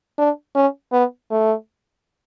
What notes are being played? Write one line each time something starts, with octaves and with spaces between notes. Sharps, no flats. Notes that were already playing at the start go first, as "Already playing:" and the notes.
D4
C#4
B3
A3